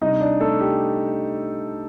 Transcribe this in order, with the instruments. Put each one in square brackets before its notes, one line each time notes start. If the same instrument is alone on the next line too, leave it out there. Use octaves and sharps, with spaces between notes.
[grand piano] C3 G3 D4 D#4 D#5
D4 D5
A3 A4
G4